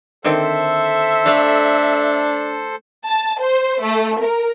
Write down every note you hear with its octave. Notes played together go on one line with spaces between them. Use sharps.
D3 D#3 C4 A4 C5 E5
A3 D4 F5
A5
C5
A3
A#4